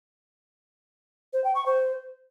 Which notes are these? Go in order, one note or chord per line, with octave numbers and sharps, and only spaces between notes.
C5
G5
C#6
C5